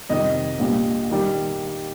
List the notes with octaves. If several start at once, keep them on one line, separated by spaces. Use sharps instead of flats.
F2 C3 D#3 G3 D#5
A#1 A#2 G3
D#3 G3